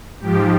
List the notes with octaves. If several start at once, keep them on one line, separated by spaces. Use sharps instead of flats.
G#2 F3 G4